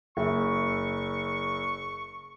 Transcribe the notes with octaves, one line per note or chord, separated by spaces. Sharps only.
F#1 E5 C#6